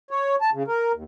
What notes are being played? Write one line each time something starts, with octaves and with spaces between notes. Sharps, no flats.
C#5
A5
C#3
A#4
D#2